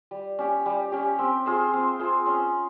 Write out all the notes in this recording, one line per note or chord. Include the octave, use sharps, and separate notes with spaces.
G3
C#4 G4
G3
C#4 G4
C4
F4 G#4 C5
C4
F4 G#4 C5
C#4